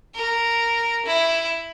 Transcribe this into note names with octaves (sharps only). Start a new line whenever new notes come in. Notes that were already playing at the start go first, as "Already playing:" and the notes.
A#4
E4